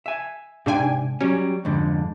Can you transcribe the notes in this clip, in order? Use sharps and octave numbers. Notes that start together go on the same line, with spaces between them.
E5 G#5
G#2 C3 D4 F5 G5 G#5
F#3 G3 C#4
F2 G#2 D3